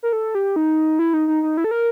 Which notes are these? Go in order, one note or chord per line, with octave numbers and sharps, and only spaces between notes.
A#4
A4
G4
D#4
E4
D#4
D#4
D#4
E4
A4
A#4